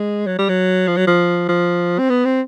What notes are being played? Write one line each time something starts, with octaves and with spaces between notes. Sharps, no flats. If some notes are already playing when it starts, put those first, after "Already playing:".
Already playing: G#3
F#3
G3
F#3
F3
F#3
F3
F3
C4
B3
C4